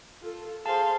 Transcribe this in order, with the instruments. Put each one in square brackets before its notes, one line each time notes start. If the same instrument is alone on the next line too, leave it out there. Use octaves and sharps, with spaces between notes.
[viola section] F4 A4
[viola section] G#4 C5 [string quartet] F5 G#5 C6 [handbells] A5